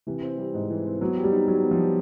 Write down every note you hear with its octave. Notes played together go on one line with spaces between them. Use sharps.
C3 E3
C4
G3
G#2
E3
C4
F#3 B3
G4
G3
D#4
F#3 G3
B3
F3
G4